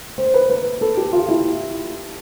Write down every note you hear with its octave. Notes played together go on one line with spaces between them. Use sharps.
C5
B4
B4
A4
G4
F4
E4